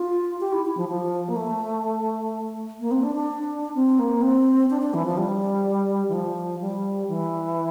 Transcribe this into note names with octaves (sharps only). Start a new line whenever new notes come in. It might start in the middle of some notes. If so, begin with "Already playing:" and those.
Already playing: F4
G4
E4
E4
F3
F3
A#3
A3
A#3
C4
D4
D4
C4
A#3
C4
D4
D4
E3
F3
G3
E3
F3
G3
E3